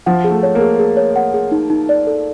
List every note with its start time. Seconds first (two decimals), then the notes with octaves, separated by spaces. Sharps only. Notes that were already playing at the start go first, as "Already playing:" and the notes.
0.06 F3 F#5
0.24 G#4
0.31 A3
0.43 C#5
0.55 A#3
0.61 G#4
0.79 G#4
0.97 C#5
1.16 F#5
1.34 G#4
1.52 D#4
1.70 D#4
1.89 D5
2.07 A4